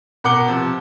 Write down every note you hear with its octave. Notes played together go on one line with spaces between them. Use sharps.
B2 A#4 F#5 D6 C#7 G7
C3 F3